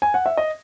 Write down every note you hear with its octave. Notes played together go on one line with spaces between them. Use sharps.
G#5
F#5
E5
D#5